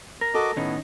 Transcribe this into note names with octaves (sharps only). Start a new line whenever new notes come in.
A#4 A#6
F#4 A4 D#5 D6
A2 D#3 B3 C#4 D#4